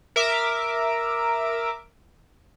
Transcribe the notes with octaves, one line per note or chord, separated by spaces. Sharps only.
A#4 E5 D6